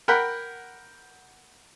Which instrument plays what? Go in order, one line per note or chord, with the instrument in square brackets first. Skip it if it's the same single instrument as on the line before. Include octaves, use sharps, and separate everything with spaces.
[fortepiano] A#4 F#5 G5 B5